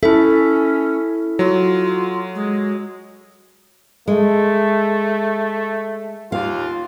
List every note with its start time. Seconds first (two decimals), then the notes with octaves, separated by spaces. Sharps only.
0.03 C#4 E4 A4 E5
1.39 F#3 F4
2.35 G#3
4.08 G#3 A3
6.32 D#2 F4 F5